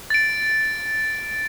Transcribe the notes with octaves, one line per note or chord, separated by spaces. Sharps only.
A6 D7